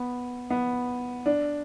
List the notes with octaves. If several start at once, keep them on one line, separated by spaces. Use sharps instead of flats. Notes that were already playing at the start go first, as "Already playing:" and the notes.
Already playing: B3
B3
D4